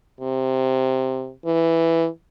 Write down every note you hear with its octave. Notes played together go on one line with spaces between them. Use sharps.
C3
E3